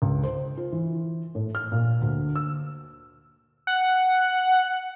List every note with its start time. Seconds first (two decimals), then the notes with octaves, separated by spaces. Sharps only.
0.02 C#2
0.23 C5
0.57 F4
0.72 E3
1.35 A2
1.55 F6
1.72 A#2
2.01 D2
2.36 E6
3.67 F#5